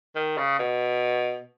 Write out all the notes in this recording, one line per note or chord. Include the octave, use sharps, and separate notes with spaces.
D#3
C#3
B2